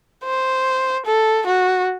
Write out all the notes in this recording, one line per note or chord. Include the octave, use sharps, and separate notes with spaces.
C5
A4
F#4